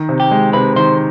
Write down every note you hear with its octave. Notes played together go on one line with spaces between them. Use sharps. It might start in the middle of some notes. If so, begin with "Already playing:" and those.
Already playing: D#3
C3
G4
G#3
C3 B4
D#3 C5